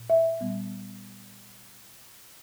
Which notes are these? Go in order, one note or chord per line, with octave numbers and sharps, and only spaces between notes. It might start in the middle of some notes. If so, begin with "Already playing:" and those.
Already playing: A#2
E5
A#2 G3 B3